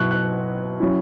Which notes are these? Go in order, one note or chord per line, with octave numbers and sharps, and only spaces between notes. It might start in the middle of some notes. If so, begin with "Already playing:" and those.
Already playing: B2 F#3 E4 C#6 F#6
F#6
F#3 C#4 E4